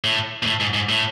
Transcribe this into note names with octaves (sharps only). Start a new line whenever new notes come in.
A2
B2
A2
G#2
G#2
A2